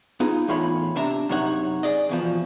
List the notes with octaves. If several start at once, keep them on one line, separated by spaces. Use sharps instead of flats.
B3 D#4 F4 G#4
E2 A2 F4 C#5 B5
C3 D4 E5 A#5
F#2 C3 D#4 C#5 F#5
G#4 D5 D#5
E2 B2 F3